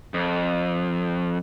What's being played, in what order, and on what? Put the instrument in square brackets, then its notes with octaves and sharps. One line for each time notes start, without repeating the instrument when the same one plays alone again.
[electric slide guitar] F2